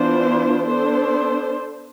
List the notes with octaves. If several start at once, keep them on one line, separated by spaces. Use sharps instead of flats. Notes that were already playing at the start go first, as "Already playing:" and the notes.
Already playing: E3 B3 D4 F4 C5
B3 D4 A4 C5